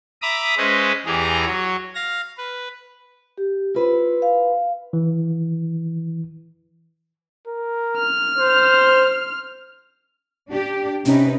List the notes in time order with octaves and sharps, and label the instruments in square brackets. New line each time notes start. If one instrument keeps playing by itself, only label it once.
[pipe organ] E5 A#5 B5 D6 D#6
G#3 C#4 B4 C5 D#5 E5
E2 E3 G4 G#4 A#5
F#3 C#5
F5 A#6
B4
[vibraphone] G4
[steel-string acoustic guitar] E4 B4 C5 [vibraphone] F4
[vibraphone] F5
[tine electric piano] E3
[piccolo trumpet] A#4
[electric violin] F6
[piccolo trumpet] C5
[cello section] D4 G4
[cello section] C3 D#4 B4 [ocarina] C#4